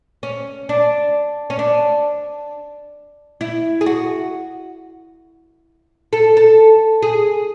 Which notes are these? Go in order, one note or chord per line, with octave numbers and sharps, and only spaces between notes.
C#4
D4
C#4
D4
E4
G#4
F#4
A4
A4
G#4